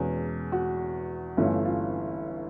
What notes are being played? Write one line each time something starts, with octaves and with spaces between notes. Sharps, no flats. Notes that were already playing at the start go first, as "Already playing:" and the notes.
Already playing: E2 B2 G#3 C#4 G#4
F#4
G1 G2 E3 A3 C#4 F4
F4